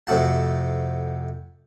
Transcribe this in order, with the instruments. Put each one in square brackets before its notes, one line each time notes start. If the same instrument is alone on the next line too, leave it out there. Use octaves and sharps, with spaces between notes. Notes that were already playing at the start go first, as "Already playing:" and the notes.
[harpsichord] F2 C3 A3 F#4 A5